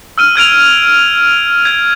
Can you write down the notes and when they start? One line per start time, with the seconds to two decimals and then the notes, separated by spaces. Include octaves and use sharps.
0.18 E6 F6 D#7
0.36 F6 G#6 D7 F7
1.65 G#6